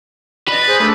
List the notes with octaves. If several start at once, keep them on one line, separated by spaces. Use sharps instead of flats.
B4 D5 D#5
G#4 C5
A3 D4 A4 B5